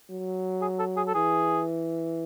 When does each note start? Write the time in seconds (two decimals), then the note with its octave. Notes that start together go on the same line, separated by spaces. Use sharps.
0.10 F#3
0.62 G#4
0.79 A4
0.97 G#4
1.08 A4
1.15 E3 G#4